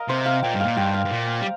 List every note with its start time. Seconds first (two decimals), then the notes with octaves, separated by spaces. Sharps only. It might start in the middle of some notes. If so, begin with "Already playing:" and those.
Already playing: A#4 D#5 F5
0.09 C3 C5
0.26 F5
0.43 A#2 G5
0.54 G2
0.61 A#2 F5
0.77 G2 G5
0.94 F5
1.05 G2
1.11 A#2
1.41 G3